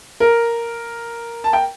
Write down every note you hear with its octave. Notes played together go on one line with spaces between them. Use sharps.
A#4
A5
G5